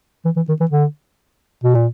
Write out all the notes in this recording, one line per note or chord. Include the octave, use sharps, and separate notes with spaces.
E3
E3
D#3
E3
D3
B2
A#2